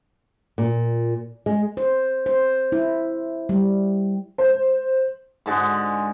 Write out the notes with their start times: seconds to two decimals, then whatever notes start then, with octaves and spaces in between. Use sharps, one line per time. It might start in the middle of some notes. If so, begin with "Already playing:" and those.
0.58 A#2
1.46 G#3
1.77 C5
2.26 C5
2.72 E4
3.49 G3
4.38 C5
5.46 G#2 D3 G#3 F#4